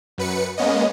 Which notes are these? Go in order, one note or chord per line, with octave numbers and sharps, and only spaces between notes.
F#2 B4 C#7
G#3 A#3 B3 C#4 D#5